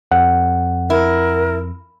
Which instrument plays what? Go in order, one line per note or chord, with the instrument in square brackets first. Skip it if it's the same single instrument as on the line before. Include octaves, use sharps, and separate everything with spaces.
[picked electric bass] F2 [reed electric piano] F#5
[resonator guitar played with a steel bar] E4 [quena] A#4